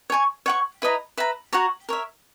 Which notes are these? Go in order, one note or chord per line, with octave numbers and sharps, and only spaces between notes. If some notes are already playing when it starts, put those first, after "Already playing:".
C#5 G#5 C#6
C#5 F#5 C#6
E4 B4 D#5 A#5
B4 E5 A#5
F#4 C#5 F#5 A#5
A#4 C#5 E5